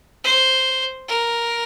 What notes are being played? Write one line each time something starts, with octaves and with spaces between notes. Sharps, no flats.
C5
A#4